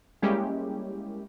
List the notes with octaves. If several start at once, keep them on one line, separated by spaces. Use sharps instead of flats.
G3 G#3 A#3 C#4 E4 G4